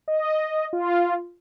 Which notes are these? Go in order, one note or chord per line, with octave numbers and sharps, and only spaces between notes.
D#5
F4